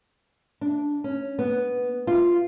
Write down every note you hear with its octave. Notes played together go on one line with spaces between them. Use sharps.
D4
C#4
B3
F4